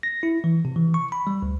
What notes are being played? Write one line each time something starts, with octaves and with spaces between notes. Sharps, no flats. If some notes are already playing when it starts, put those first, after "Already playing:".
A#6
E4
E3
C3
E3
C#6
B5
G3
D2